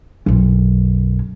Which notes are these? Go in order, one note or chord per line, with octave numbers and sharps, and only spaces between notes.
B1 F#2